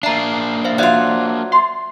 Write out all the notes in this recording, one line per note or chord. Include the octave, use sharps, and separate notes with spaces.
A#3 D4 E5 A#5 C7
C5 E5 F5
F#3 F4 C5 D5 E5
E5 C6